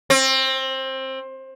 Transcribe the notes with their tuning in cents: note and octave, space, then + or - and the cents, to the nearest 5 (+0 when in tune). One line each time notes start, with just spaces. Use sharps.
C4 +20